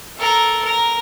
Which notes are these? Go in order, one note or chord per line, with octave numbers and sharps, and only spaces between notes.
A4 A#4
A#4